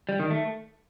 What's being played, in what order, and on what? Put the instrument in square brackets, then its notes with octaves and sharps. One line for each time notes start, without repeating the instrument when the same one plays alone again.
[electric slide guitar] G3
D#3
A3